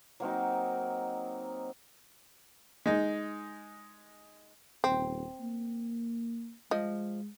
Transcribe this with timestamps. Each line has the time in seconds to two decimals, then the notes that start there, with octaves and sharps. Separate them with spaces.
0.20 F#3 A#3 C4 D#4
2.86 G#3 D#4
4.84 D#1 C4
5.41 A#3
6.71 F3 G#3 D#5